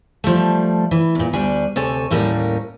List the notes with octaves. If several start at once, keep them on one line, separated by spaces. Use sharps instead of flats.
F3 G3 A3
E3
E2 A#2
D2 G3 D4 G#5
D2 C3 A4 C#5 G#5
D#2 A2 G3 A#3 C#4 A#4